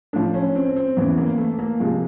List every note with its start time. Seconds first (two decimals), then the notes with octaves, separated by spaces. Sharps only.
0.13 A2 F3 D4
0.34 C#4
0.55 C4
0.76 C4
0.97 E2 C#3 E3 B3
1.18 A#3
1.38 A3
1.59 A#3
1.80 C3 F3 G#3